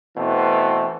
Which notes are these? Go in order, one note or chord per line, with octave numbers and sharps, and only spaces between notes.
B2 E3 A3 C4